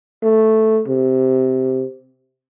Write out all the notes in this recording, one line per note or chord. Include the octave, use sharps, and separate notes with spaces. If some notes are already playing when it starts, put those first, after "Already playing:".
A3
C3